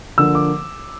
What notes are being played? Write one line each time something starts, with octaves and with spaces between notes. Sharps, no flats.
D3 F3 A#3 E6
D6